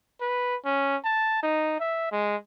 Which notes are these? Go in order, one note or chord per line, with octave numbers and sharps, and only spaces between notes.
B4
C#4
A5
D#4
E5
G#3